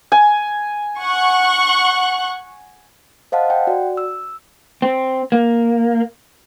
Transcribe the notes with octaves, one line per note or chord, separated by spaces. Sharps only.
G#5
F#5 C#6 F#6
C5 D#5 F5 F#5 A5
F#5 G5
F#4 D5
E6
C4
A#3